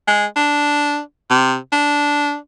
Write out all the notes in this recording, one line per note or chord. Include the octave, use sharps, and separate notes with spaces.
G#3
D4
C3
D4